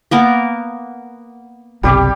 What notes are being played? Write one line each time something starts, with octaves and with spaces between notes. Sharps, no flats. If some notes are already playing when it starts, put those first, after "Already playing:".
A#3 B3 A#4
F#1 B1 C3 G3 G4 D6